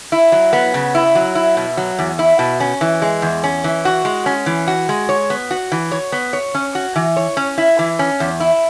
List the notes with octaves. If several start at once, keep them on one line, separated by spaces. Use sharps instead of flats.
E4
F#3
B3
C#3
E4
F#3
E4
B2
F#3
E2
E4
B2
C#4
E3
G#3
E2
C#4
E3
F#4
G#3
C#4
E3
F#4
G#3
C#5
B3
F#4
E3
C#5
B3
C#5
C#4
F#4
E3
C#5
C#4
E4
E3
C#4
E2
E4